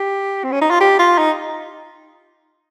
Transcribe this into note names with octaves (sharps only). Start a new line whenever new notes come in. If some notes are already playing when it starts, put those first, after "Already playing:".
Already playing: G4
C4
C#4
D#4
F4
G4
F4
D#4